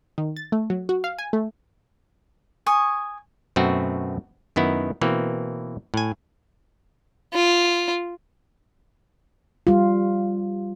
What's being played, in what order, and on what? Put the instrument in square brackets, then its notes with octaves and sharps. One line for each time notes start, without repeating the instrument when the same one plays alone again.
[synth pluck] D#3
A6
A3
F#3
F#4
F5
G#5
A3
[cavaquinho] G#5 C#6 D#6
[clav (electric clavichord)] F#2 B2 A3 C4 F#4
F#2 D#3 B3 E4
B2 E3 A#3 C4
A2 G#5
[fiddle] F4
[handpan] G3 F4